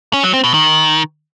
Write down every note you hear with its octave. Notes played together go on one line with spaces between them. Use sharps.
C#4
F#3
C4
B2
D#3